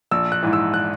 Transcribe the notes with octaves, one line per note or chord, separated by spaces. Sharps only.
A#1 E6
F#6
G#2 E3
E6
F#6